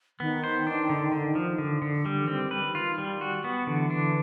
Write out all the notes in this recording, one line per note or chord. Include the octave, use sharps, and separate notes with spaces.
D#3 B3
C5
D4
D3
D3
F3
D3
D3
G3
E3
D#3 C4
B4
F4
G3
F#4
B3
D3 E3
D4